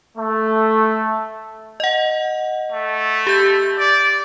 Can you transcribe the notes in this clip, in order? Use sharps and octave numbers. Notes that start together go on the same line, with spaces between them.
A3
D#5 F#5
A3
G4 G6
D5